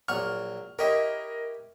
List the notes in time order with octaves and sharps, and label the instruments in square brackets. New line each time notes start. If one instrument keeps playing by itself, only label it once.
[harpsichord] A#1 F#3 C#6 [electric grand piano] F6
[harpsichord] E4 G4 C#5 [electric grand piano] A#4 D#5